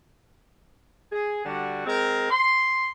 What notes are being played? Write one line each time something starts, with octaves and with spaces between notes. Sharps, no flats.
G#4
D3 G3 F#4
G#3 C4 A#4
C6